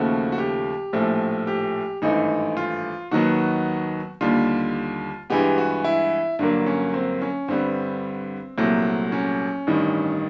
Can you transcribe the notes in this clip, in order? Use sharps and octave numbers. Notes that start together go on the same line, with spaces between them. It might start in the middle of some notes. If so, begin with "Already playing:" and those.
Already playing: D#2 C#3 F3 A3 F#4
F#4
G4
A#1 A2 F3 A3
G4
G#1 G2 E3 A3 D#4
F4
D#2 D#3 F#3 B3 F#4
D#2 D3 G3 F4
G2 E3 G#3 B3 G4
F#4
E4
G2 D3 F#3 A#3 D4
C#4
C4
C#4
G2 D3 G3 B3 C4
C2 A#2 F#3 A3
C#4
A1 G2 D#3 G3